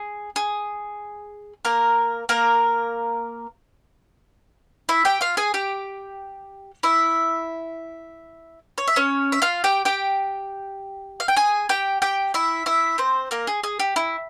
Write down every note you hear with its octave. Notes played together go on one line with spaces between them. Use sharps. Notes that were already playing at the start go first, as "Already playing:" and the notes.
Already playing: G#4
G#4
A#3 A#4
A#3 A#4
E4 E5
G4 G5
F4 F5
G#4 G#5
G4 G5
E4 E5
C#5
E5
C#4 C#5
E5
F4 F5
G4 G5
G4 G5
F5
G5
G#4 G#5
G4 G5
G4 G5
E4 E5
E4 E5
C4 C5
A#3 A#4
G#4
G#4
G4
E4